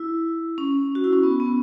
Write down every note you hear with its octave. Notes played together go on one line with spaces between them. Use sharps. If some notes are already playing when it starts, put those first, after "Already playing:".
Already playing: E4
C#4
F#4
E4
C#4
B3
B3